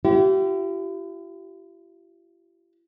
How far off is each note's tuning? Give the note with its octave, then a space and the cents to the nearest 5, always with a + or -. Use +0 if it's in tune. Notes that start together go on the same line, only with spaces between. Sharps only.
E4 +45 G4 -35